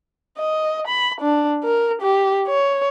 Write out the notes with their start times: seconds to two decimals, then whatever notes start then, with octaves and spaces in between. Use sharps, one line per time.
0.38 D#5
0.87 B5
1.21 D4
1.64 A#4
2.01 G4
2.47 C#5